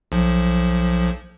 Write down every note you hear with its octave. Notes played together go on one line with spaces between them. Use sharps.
B1 F3